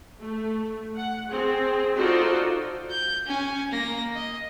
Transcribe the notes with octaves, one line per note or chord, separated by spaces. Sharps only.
A3
F#5
C4 G#4
D#4 F4 F#4 A4 C5 D5
G6
C#4 G#5
A#3 A#6
D#5